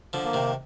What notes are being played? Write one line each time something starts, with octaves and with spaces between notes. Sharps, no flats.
D3 F3
A#3
C3 D#3